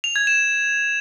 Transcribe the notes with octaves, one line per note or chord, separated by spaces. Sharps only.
F7
G#6
E7